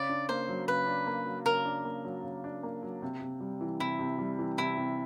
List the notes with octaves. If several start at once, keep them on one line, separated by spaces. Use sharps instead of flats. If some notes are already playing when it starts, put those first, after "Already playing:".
Already playing: C#3 D5
D4
A#3 C5
F#3
C#3 B4
D4
A#3
F#3
C#3 A#4
D4
A#3
F#3
C#3
D4
A#3
F#3
C3
C3
G3
E3
C3 E4
C3
G3
E3
C3 E4
C3